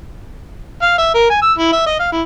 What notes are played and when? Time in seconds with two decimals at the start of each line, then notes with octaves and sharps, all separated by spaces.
0.82 F5
0.98 E5
1.14 A#4
1.30 G#5
1.42 E6
1.58 E4
1.72 E5
1.87 D#5
2.00 F5
2.12 E4